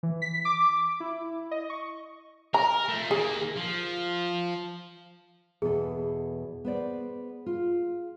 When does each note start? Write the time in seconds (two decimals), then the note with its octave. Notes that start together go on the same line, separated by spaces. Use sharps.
0.03 E3
0.22 B6
0.45 D6
1.00 E4
1.51 D#5
1.70 C#6
2.54 A#4 A#5
2.88 F3 A3
3.11 D#3 A#3 G#4
3.56 F3
5.62 E2 B2 G#4 A4
6.65 B3 C5 D5
7.46 F4